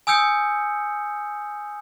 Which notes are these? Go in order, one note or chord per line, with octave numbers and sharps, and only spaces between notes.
G#5 D#6 E6 G6 C#7